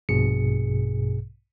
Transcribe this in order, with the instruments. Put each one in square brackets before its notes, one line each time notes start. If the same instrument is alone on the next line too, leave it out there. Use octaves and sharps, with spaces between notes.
[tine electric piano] A#1 G2 B2 G#4 C#7